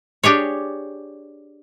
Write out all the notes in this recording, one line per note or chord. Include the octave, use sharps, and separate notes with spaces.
D4 G4 G#4 C#5